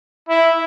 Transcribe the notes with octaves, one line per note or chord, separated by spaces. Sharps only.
E4